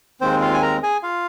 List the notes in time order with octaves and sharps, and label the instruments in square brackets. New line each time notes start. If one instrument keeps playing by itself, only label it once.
[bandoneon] D#2 D#3 G#3 C4 C5
F4 F5
G#5
A#4 A#5
G#4 G#5
F4 F5